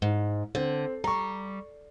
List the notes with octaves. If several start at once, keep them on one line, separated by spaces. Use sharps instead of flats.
G#2
D3 C4
G3 A#5 C#6